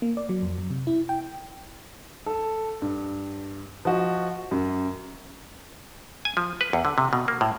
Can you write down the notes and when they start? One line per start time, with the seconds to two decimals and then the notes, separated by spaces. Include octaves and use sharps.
0.02 A#3
0.17 D5
0.29 F#3
0.42 F2
0.58 F#2
0.70 C3
0.87 E4
1.09 G5
2.26 A4
2.82 G2
3.85 F3 F#4 D#5
4.51 F#2
6.25 G#5
6.37 F3
6.61 B4
6.73 E2
6.85 D3
6.98 C3
7.13 B2
7.28 A#3
7.41 A2